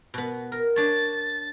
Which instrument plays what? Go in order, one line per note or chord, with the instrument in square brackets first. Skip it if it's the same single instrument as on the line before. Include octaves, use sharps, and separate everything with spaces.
[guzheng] B2 B3
A#4
[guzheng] D4 C#5 [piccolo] A6